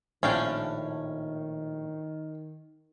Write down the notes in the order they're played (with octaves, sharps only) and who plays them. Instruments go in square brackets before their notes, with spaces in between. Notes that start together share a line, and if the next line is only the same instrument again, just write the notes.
[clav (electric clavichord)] A#1 A2 D4 [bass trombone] D#3 [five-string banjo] C#4 F5 G5